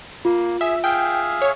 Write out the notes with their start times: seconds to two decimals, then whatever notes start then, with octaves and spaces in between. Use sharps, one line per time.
0.25 A#3 F4
0.61 G#4 E5
0.84 G#4 E5 F5 G5
1.42 C#5